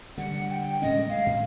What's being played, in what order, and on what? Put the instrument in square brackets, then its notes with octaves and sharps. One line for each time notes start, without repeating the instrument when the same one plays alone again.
[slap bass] D3 G3 [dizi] F#5
[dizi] G5
[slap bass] A2 G#3 C#4 [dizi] D#5
[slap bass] G#3 [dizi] F5
[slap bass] A2